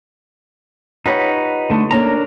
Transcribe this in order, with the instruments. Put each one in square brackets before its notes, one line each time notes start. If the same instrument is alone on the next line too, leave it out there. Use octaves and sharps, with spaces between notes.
[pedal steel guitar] D#4 B4 F#5 [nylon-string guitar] F4 G4 C#5
[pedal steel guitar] D3 A3
[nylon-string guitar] A#3 C#4 A4 [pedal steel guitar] D4 A#4 A#5